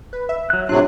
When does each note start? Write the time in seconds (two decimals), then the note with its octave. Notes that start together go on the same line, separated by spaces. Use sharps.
0.13 B4
0.29 E5
0.50 F#3 F#6
0.69 A2 C3 F#3 D4 F4 F#6